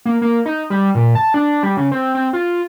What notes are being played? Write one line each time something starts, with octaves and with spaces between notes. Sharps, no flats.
A#3
A#3
D#4
G3
A#2
A5
D4
G3
C#3
C4
C4
F4